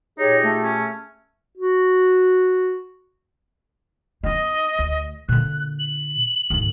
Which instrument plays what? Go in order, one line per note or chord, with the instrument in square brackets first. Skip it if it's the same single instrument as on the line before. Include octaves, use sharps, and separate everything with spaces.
[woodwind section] A#2 G4 G#4 [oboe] D#4 [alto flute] C#5
[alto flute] A3
[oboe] C#4
[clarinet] F#4
[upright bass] B3 D#4 [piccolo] D#5
[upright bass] D2
[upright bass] A#2 D3 [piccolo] F#6
[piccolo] F#7
[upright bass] D2 G#2